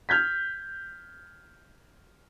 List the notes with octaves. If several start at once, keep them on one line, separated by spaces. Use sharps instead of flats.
F6 G6 G#6 B6